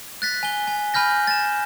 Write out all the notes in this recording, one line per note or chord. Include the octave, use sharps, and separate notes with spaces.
F#6 A6 B6
G#5 G7
G#5
G#5 B5 F6 G6 A#6
A6 E7